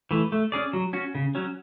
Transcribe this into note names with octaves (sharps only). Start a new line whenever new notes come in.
E3 A3
A3
C#4 G#4 D5
F#3
C#4 F#4
C#3
F#3 C#4